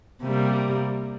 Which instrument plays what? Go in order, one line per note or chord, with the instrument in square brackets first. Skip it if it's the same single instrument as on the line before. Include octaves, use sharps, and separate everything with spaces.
[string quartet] C3 G3 A#3